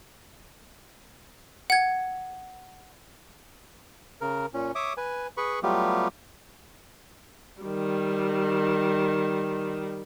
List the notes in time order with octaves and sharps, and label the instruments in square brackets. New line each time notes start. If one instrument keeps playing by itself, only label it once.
[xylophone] F#5 G#6
[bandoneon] C#3 A#4
A#2 C#4
C#5 E5 D6 D#6
B4 G#5
G#4 B4 B5 C#6
F#3 G3 A3 B3 F4 G4
[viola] D#3 G3